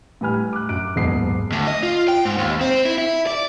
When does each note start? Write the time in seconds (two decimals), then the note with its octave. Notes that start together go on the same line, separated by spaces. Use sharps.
0.21 A2 G3 B4 G#5 B5 F6
0.53 D6 F#6
0.69 F#2 F#6 D7
0.96 F#1 D#2 G#2 B3 G#4 C7
1.52 D2
1.67 D#5
1.83 F4
2.08 G5
2.25 G#2
2.38 D#2
2.61 C4
2.86 E4
2.98 E4
3.27 D5